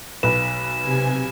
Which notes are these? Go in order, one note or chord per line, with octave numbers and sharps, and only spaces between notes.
B1 B4 E7
C3 G#5